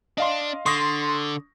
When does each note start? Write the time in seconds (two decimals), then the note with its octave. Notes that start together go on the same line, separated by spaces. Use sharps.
0.18 D4 D#5 F5 C6
0.66 D3 C6 C#6 D#6 A#6